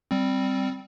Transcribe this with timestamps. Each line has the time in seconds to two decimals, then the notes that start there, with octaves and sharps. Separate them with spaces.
0.11 G3 C4